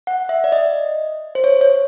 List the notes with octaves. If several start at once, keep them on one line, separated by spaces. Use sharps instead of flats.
F#5
E5
D5
D#5
C5
C#5
C#5